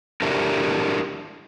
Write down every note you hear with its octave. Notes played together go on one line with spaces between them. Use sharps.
D4 E4 G4 A4 A#4 E5